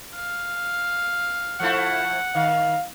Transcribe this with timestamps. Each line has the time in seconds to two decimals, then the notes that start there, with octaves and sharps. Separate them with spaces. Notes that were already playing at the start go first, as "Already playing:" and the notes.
0.15 F5
1.60 F3 A3 E4 F#5
2.35 D#3 F5